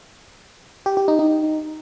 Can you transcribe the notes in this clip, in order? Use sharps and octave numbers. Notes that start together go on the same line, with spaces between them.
G4
G4
D#4
D#4